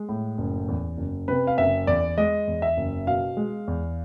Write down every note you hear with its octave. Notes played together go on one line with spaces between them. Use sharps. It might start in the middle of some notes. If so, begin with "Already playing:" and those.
Already playing: G#3
A2
F#1
E2
F#1
C3 B4
F5
F#1 E5
E2 D5
G#3 D#5
E2
E5
F#1
B2 F5
G#3
E2